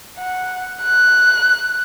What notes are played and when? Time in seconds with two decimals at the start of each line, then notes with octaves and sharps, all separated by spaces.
0.18 F#5
0.82 F#6